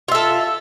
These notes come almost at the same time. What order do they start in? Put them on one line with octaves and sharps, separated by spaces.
F4 E5 A4